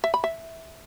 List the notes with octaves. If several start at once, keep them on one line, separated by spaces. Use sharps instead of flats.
E5
B5
E5